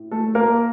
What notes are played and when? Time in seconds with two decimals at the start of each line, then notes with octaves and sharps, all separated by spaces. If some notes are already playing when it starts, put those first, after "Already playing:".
Already playing: A2
0.11 A3 A4
0.35 A#3 A#4